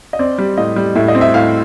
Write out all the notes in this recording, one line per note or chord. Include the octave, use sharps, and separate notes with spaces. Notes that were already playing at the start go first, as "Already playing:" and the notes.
D#5
C4 D5
G3
A2 D#5
G3
A2 E5
D#5
C4
E5
A2 F5